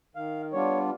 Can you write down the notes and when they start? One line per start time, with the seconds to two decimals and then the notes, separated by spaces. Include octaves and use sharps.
0.16 D#3 F5
0.53 G3 B3 D4 F4 C#5